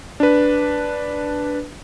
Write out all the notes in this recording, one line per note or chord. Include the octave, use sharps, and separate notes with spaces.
D4 B4